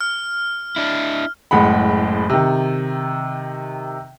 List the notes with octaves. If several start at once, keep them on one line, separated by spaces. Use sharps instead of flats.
F6
D4 E4
F#1 A2 G#3 F#5 B5
C3 D#3